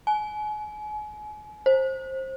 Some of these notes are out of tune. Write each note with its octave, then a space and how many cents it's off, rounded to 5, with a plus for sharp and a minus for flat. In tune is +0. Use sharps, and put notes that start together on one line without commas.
G#5 +35
C5 +20